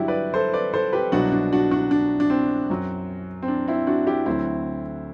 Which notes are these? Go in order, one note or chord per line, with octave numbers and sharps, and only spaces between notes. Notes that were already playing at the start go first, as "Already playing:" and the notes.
Already playing: G2 D3 F#3 D4 E4 F#4 G4
B4 D5
A4 C5
B4 D5
A4 C5
G4 B4
C2 B2 F#3 D4 F#4
D4
D4 F#4
D4 F#4
D4
D4
C4
F#2 F#3
C4
D4
C4 E4
D4 F#4
E4 G4
D2 D3 F#3 C4 E4